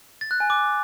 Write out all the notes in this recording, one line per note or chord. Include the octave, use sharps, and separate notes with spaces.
A6
F#6
G#5
D6